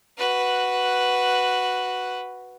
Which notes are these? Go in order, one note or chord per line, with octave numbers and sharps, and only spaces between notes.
F#4 B4